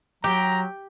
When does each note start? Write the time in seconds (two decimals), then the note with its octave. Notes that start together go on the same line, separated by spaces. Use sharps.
0.24 F#3 G4 G5 A#5